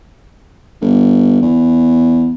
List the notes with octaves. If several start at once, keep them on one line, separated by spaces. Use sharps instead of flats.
G1
E2